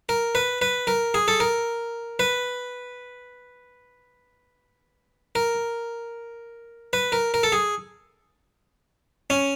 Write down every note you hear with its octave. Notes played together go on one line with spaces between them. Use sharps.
A#4
B4
B4
A#4
G#4
A4
A#4
B4
A#4
B4
A#4
A#4
A4
G#4
C#4